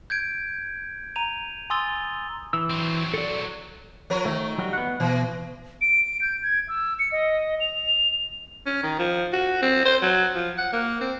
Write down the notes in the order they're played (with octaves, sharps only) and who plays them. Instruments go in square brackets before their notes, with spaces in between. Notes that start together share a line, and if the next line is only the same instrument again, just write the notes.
[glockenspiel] G6 G#6 D7
A#5 D#7 F7
G#5 C6 D#6 E6 A6 G7
[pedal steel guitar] E3 E6
[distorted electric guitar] F#3 C4
[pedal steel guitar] A4 D5
[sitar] F3 A#4 C#5
[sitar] D#3 [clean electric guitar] A3
[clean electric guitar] F#3 G3 F#4
B3 F#5
[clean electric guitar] B2 [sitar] E3
[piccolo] D7
G6
G#6
E6
C#7
D#5
F7
[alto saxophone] C#4
D#3
F3
F#4
C4
C5
F#3
F3
F#5
A#3
C4